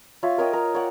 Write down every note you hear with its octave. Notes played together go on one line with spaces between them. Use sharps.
F4 C#5 E5
A#4 C#5 D#5 G5
A#4
C#5 D5 F#5